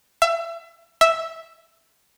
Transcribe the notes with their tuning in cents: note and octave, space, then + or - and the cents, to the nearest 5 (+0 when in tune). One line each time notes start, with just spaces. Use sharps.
E5 +30
E5 -5